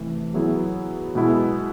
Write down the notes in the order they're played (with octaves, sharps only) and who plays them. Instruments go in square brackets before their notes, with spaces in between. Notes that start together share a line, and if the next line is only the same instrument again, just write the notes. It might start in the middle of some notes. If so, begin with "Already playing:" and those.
Already playing: [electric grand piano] C3 E3 A3
F#3 B3 E4 G#4
B2 G#3 B3 E4 G#4